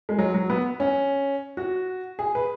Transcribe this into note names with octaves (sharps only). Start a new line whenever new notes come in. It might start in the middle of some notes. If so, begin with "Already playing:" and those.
G#3
F#3
F#3
B3
C#4
F#4
G#4
B4